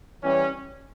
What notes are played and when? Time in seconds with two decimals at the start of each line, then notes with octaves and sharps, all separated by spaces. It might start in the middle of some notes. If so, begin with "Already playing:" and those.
0.22 E3 G3 C#4